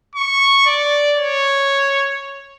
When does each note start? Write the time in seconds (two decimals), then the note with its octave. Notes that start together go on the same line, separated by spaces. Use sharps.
0.16 C#6
0.66 D5
1.17 C#5